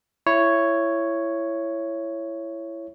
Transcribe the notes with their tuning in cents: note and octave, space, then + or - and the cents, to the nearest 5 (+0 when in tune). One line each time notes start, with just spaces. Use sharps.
E4 +20 C#5 +0